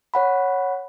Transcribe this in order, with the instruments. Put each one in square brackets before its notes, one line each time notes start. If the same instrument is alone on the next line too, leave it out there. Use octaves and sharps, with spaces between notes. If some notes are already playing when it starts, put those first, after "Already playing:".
[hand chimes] C#5 F#5 B5